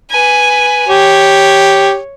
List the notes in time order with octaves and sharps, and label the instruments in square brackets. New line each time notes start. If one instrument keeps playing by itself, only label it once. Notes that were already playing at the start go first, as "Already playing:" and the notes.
[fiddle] B4 G#5
[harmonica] G4 [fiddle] C#5